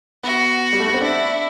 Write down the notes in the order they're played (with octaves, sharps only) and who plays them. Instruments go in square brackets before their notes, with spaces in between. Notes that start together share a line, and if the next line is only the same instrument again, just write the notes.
[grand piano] B3 [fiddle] F#4
[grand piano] G3
A3
B3
C4
[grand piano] D4 [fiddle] E4